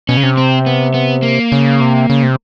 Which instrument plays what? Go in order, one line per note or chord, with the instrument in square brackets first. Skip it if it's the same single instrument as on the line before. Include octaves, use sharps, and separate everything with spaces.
[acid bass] B2 [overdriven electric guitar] C#4
[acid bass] C#3
C3
[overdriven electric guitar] C4
B3
B3
A#3
[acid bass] C#3
C3
C#3
C3